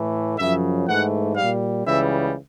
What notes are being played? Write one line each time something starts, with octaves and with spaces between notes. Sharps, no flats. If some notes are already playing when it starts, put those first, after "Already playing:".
Already playing: A2 E3 A3
F#2 C#3 F3 E5
G#2 E3 A3 F#5
A#2 G3 F5
C#2 C#3 E3 G3 E5